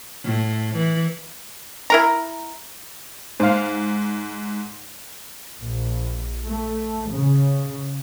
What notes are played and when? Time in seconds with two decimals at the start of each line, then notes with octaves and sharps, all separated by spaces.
0.25 A2
0.77 E3
1.90 E4 A#4 A#5
3.40 G#2 C5 F5
5.62 A#1
6.47 A3
7.12 C#3